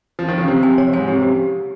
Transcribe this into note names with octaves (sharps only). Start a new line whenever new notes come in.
F3
D#3
C#3
C3 G4
G#5
C#5
G#2 G#5
C3 G4
C#3 G4